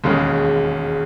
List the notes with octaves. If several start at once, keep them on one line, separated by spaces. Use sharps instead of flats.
E1 D#2 C#3 G#3